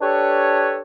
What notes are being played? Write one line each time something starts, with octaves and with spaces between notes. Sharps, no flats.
D4 G4 A4 B4 C#5